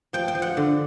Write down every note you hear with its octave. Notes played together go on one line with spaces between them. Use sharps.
F3 G5
G5
F3
F#5
D3